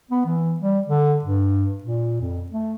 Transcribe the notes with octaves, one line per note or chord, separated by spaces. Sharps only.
B3
E3
G3
D3
G2
A#2
F2
A3